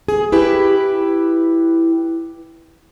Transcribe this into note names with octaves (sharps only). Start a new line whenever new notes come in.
G#4
E4 G4 B4